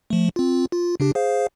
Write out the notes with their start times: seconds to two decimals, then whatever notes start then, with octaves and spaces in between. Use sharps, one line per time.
0.10 F3 A3
0.36 C4 F4
0.72 F4
1.00 C#3 D4 G4
1.15 G#4 C5 F5